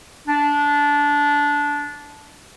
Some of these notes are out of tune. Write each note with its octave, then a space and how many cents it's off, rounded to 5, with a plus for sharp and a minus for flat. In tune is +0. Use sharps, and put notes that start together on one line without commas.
D4 -15